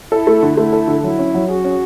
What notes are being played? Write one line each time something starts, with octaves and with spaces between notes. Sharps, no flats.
E4 A4
A3
D3
A3 E4
A4
D3
F#3 E4
C#4
F#3
F#4 G#4
C#4